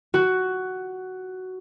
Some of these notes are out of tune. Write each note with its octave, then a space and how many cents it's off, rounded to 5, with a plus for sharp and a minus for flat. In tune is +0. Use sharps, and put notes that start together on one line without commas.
F#4 +10